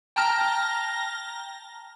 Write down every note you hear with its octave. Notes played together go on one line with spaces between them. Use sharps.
G5 A5 A#5 F6 A#6